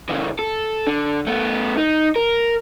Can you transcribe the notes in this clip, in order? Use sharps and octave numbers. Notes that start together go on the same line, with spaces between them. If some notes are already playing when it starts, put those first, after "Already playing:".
C#3 E3
A4
D3
A3 B3
D#4
A#4